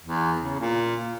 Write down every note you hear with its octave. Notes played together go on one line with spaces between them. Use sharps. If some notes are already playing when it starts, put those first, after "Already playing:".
E2
C#3
A#2